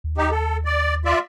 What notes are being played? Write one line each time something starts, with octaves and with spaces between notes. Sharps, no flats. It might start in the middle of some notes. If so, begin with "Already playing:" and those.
D#2
D#4 G4
A4
D5
F4 D5 E5